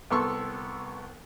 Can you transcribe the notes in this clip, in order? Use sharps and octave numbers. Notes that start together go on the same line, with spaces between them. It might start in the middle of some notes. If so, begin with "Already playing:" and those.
C2 B3 A4 C6 C#6 E6